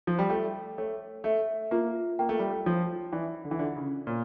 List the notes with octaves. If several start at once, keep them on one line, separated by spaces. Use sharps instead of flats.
F3
G3
A3 G5
A3 C#5
A3 E5
A#3 F4
A#3 G5
A3
G3
A3
F3 C#5
E3 D5
D3
E3
D3 F4
C#3
A#2 C#5